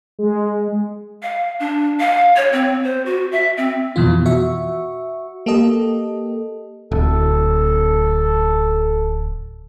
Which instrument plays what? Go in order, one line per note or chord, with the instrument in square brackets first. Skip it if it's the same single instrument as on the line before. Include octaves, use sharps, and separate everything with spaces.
[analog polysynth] G#3
[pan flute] F5
D4
F5
C#5
C4
C5
F#4
E5
C4
[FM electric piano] F2 B2 E3 F4
F#4 E5 C#6
A#3 G4 A4 D#5
[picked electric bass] D1 [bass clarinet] A4